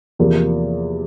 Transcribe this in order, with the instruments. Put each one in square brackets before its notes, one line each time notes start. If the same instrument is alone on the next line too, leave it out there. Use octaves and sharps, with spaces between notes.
[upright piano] E2 C3 F3 A#3